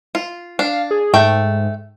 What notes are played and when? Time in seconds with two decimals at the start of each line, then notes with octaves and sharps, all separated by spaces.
0.15 F4
0.59 D4 F5
0.91 G#4
1.14 G#2 A3 G5